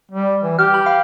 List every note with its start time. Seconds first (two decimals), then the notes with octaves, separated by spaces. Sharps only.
0.11 G3
0.43 E3
0.59 G4 F6
0.74 B5
0.86 F5